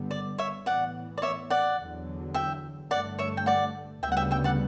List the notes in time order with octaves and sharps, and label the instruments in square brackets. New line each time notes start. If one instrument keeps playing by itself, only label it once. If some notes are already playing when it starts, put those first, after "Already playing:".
Already playing: [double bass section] G2 D3 G3 B3
[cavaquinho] D5
C#5 E5
[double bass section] A2 E3 B3 [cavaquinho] D5 F#5
[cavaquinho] D5
C#5 E5
D5 F#5
[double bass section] E2 D3 F#3
[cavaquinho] E5 G5
[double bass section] G2 D3 A3 [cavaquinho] D5 F#5
[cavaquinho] C#5 E5
G5
D5 F#5
[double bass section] D2 C#3 G3 B3 [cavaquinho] E5 G5
[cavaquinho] F#5
E5 G5
E5 G5
D5 F#5